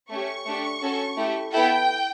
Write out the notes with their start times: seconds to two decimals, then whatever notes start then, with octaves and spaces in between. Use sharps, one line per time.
0.10 A3 C#4 G4 C#6
0.46 A3 D4 G4
0.82 C#4 F#4 A4
1.17 A3 E4 G4
1.53 B3 E4 A4 G5